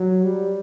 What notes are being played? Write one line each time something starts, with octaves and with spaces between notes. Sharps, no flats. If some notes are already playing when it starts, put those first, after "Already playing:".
Already playing: F#3
G3